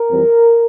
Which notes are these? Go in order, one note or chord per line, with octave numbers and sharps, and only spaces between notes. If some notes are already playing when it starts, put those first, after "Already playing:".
Already playing: A#4
F2 E3 G3 C4